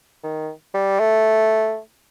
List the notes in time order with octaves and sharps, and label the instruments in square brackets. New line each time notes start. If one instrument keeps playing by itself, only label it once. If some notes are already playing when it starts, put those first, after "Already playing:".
[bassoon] D#3
G3
A3